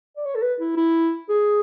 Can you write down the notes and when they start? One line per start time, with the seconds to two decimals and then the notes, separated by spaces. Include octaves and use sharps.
0.17 D5
0.25 C#5
0.35 A4
0.42 B4
0.60 E4
0.76 E4
1.29 G#4